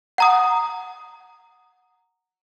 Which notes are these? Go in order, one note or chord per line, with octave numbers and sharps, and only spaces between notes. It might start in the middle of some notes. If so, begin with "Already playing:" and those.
F#5 A#5 D#6